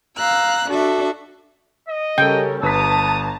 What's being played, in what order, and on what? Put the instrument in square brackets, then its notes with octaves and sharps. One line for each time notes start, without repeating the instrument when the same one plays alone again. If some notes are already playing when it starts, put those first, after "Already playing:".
[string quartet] F5 A#5 E6 F#6
D4 F#4 A4 E5
[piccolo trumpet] D#5
[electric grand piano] C#3 A4 [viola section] G3 C#4 A#4 [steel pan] G5
[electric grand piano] G1 B4 B6 [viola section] A5 A#5 [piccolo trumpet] D#6